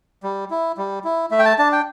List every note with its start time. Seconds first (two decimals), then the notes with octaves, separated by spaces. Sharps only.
0.23 G3
0.51 E4
0.78 G3
1.04 E4
1.31 A3 E5
1.39 G5
1.45 A5
1.59 D4 A5
1.72 G5